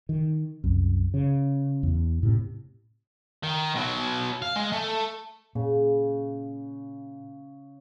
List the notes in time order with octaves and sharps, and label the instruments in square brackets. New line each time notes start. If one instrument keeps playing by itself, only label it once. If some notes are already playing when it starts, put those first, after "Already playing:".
[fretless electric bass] D#3
C2 F#2
C#3
E2
A2 C3 C4
[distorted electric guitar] D#3
B2 F#3
F5
G#3
A3
[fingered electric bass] A#2 [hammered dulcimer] C#3